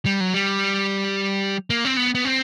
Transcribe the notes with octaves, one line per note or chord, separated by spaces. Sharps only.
G3
F#3
G3
A#3
C4
B3
B3
C4